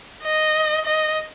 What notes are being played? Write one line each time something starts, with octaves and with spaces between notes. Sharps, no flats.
D#5
D#5